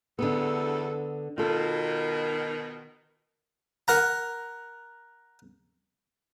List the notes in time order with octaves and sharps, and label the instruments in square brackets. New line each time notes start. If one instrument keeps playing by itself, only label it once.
[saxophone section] E2 G2 A4 [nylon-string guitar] D3 B3
[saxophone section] B2 D#3 [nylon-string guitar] F4 A4
[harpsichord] A#4 F#5 A#5